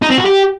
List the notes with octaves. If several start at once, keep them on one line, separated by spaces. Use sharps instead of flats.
D#4
C4
F#4
G4